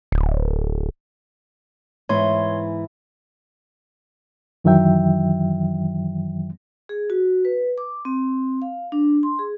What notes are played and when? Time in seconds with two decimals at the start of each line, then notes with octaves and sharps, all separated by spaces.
0.12 D1
2.09 G#2 E3 B3 E4 C#5 C6
4.64 F#2 D#3 E3 F#3 E5 G5
6.89 G#4
7.10 F#4
7.45 B4
7.78 D6
8.05 C4
8.62 F5
8.92 D4
9.23 C6
9.39 G#4